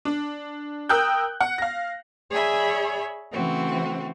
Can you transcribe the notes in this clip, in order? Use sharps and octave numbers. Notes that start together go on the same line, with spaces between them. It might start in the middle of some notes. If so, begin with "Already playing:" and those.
D4
A#4 G5 D#6 E6 F#6 G6
F#5
F5 A#6
G#4 C#5 D5 E5 G#5 B5
C#3 E3 A3 C4 F#4